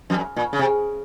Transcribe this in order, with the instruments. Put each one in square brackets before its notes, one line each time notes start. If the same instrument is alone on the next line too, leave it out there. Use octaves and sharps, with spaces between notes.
[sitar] F2
F#2
A#2
C#3
C3